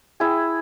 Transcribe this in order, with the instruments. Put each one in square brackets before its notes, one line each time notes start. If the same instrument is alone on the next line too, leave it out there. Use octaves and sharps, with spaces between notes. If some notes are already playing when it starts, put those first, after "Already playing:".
[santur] E4 G#4